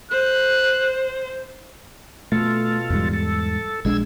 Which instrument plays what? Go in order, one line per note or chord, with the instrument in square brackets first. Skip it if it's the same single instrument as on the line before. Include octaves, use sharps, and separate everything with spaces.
[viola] C5 [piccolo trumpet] F#6
[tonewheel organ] B2 F4 A4 [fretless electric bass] A3
[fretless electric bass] E2 G#2 G3
[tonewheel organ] A4
[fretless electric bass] A#1 G#3 D4 [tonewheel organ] E6 G#6